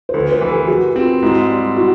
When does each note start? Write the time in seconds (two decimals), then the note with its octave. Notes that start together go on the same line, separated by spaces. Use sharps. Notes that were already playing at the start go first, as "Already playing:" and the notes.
0.09 C5
0.14 D2 A4 B4
0.32 A#4 C5
0.41 E3
0.50 G4 A4
0.68 E3 F#4 G#4
0.95 C4 F4 G4
1.22 G#2 E4 F#4
1.50 G3
1.77 E4 F#4